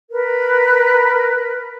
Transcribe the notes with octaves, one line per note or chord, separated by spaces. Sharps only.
A#4 B4